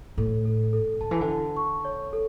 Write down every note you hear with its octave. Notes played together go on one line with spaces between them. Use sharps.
A2 A4
A4
A4
D3 A5
E3
D3
A5
C#6
C#5
A4